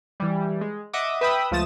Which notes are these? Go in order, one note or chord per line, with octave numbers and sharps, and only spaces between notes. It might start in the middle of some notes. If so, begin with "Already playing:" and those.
E3 G3
G#3
D#5 E5 F#5 D6 D#6
B4 E5 G5 B5 D#6 E6
C#2 F3 A3 D#6 A6 E7